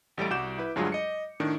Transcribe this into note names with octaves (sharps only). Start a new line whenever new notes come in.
A1 G3 A3 D7
C2 F#4 D6 G6 E7
E4 B4
D2 G2 F#3 G#3 F4 G#4
D#5 C#7
A2 D#3 D4